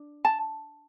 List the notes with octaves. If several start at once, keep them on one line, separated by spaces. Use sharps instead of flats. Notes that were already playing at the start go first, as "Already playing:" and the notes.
Already playing: D4
A5